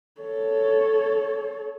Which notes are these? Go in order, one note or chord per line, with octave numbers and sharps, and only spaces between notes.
A4 C#5